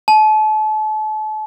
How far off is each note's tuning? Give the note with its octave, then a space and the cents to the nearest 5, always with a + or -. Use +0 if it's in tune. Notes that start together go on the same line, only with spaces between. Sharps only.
A5 -35